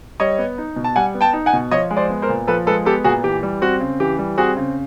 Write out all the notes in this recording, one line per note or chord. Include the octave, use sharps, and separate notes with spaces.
G3 C#5 D#5
B3
D#4
B2
A5
G3 F#5 G#5
B3
G5 A5
D#4
F#5 G#5
B2
F3 C#5 D#5
G#3
C5 D5
B3
A#4 C5
A#2
F3 A4 B4
G#3 A4 B4
B3 G4 A4
A#2 F#4 G#4
E3 G4
G3
C4 F#4
C#3
E3 G4
G3
C4 F#4 G#4
C#3